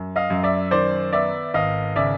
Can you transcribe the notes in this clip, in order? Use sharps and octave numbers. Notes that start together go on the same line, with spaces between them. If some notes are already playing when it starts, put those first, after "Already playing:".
Already playing: F#2
D#5 F5
F#2
D5 E5
D#3 C5 D5
B3 D5 E5
G#1 D#5 F5
C#3 D5 E5